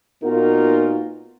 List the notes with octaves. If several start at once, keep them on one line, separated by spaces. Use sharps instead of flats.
A#2 B3 D#4 F4 F#4 A#4